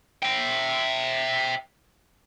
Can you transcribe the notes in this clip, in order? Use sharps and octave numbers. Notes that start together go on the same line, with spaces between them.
E5 G5